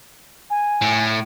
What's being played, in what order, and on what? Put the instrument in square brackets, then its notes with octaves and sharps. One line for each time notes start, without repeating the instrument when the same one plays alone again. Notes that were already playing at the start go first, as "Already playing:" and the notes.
[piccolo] G#5
[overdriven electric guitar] A2